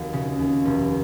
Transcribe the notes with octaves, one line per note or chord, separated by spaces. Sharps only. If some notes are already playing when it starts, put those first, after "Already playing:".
Already playing: F1 D#2 D#4 F#4
C#3
D#2
F1